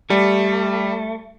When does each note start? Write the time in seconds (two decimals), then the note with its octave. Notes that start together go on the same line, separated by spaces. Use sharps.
0.10 G3 A3